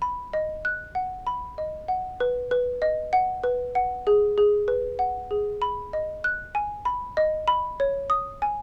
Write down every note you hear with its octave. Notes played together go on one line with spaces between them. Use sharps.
B5
D#5
F#6
F#5
B5
D#5
F#5
B4
B4
D#5
F#5
B4
F#5
G#4
G#4
B4
F#5
G#4
B5
D#5
F#6
G#5
B5
D#5
B5
C#5
D#6
G#5